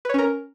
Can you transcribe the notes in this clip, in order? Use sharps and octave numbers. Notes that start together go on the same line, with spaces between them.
C#4 A#4 B4 C#5